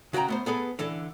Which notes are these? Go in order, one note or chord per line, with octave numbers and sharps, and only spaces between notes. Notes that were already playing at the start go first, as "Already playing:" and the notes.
C#3 F#4 C5 G5 A#5
A3 B3 C5
B3 G#4 A4 B4
D3 E3 A4